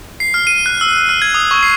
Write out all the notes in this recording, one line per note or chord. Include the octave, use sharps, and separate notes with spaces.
C7
F6
D#7
F#6
E6
F6
G#6
D#6
C#6
C7